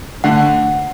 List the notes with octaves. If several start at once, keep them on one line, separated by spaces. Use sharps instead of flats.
D3 A3 F#5